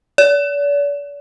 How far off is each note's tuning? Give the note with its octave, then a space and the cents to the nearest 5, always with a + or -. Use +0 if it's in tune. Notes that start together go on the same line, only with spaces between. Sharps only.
D5 -40